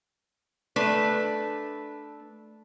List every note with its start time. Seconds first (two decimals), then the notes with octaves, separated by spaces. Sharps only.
0.76 A3 D4 B4